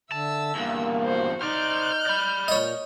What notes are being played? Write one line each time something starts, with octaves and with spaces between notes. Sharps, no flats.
D3 E5 A5 E6
E2 G2 A#3
F#4 C5
D#4 C5 D5 F6 G6
D5 B5
A#2 C#5 D#5